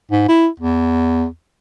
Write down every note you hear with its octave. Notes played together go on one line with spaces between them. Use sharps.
G#2
E4
E2